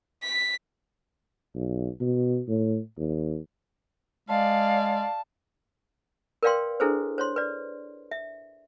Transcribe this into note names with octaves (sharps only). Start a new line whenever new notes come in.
B6
B1
B2
A2
D#2
G#3 D5 F5 A5
A#4 B4 D5 F5 G5 C6
D4 E4 G#4 A4 B4 C5
C5 C#5 C6
B4 D5
E5